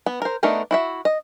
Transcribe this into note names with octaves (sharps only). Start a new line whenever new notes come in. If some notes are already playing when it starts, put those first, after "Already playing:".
B3
A#4 C5
A3 B3 D4 D#4 A#4
E4 F#4 E5
D#5